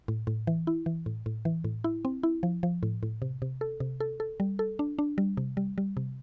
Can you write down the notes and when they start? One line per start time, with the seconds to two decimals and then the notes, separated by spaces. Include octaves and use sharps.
0.08 A2
0.27 A2
0.47 E3
0.67 E4
0.86 E3
1.06 A2
1.26 A2
1.45 E3
1.64 A2
1.84 E4
2.05 C4
2.23 E4
2.43 F3
2.63 F3
2.83 A2
3.03 A2
3.22 C3
3.42 C3
3.61 A4
3.80 C3
4.00 A4
4.20 A4
4.40 G3
4.59 A4
4.79 D4
4.99 D4
5.18 G3
5.37 C3
5.57 G3
5.78 G3
5.97 C3